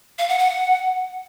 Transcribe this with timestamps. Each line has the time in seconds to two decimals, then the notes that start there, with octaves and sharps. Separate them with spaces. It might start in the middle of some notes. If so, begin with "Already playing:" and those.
0.18 F5
0.28 F#5
0.39 F#5